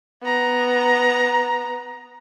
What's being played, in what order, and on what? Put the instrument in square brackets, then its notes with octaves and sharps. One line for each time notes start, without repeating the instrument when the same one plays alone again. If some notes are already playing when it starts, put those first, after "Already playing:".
[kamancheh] B3 A#5